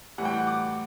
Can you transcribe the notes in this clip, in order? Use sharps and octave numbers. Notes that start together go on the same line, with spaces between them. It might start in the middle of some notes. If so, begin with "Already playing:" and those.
A2 E3 G3 F#5
G5
F#5
D6